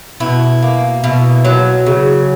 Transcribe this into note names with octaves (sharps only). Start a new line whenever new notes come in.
B2 E4
A#3
B2 E4
F#3
C#3